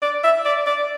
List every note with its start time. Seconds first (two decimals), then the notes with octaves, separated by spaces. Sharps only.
0.02 D5
0.24 E5
0.46 D5
0.67 D5